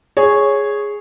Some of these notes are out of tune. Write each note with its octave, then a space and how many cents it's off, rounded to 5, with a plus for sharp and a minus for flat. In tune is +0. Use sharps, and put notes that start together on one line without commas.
G#4 +0 C#5 -5